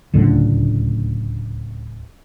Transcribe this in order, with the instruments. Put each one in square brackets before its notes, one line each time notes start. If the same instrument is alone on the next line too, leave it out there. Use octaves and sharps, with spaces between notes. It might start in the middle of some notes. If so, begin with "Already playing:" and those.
[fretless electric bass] D1 C#2 A2 D3